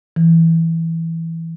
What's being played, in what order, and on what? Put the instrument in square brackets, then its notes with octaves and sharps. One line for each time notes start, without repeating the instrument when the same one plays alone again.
[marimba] E3